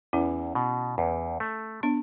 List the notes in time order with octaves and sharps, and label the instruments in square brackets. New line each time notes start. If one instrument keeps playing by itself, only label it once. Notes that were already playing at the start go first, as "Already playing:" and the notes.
[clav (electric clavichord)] E2 [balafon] C#4 E4
[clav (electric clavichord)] B2
E2
A3
[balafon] B3 D4